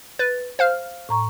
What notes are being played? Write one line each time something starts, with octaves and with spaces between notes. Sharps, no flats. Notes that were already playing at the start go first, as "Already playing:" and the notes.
B4 A6
C5 F5 F6
A2 A#5 C#6